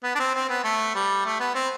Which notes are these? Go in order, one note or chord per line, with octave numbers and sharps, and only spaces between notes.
B3
D4
C4
C4
B3
A3
G3
A3
B3
C4